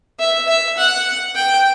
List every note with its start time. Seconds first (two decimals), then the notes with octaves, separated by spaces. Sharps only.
0.19 E5
0.48 E5
0.77 F#5
1.35 G5